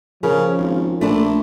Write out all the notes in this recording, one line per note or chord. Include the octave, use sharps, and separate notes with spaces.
C#3 F3 C#4 A#4
G#1
A#1 A3 D4